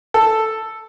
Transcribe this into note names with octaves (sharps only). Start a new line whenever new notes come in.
A4